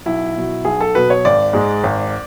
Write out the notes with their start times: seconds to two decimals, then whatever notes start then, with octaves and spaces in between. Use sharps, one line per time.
0.06 B1 E4
0.36 B2 F#3
0.65 B1 G#4
0.81 A4
0.95 B2 F#3 B4
1.10 C#5
1.25 G#1 D5
1.53 G#2 G#3
1.84 G#1